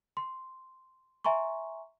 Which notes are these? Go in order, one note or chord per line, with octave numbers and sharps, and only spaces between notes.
C6
E5 G#5 A#5 C6 C#6